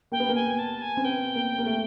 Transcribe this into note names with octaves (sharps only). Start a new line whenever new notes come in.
A#3 G5
B3
A#3
G#5
A5
G#5
C4
B3 G5
A#3
A#3
A3